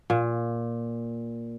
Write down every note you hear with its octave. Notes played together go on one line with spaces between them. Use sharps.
A#2